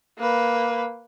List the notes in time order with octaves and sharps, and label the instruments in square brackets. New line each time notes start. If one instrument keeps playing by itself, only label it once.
[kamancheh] A#3 B4